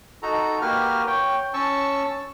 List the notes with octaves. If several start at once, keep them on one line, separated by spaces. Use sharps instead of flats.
D#4 F#4 A4 A#5
A#3 F#4 G4 B4 F6
C#5 G5
C#4 A5 C#6 E6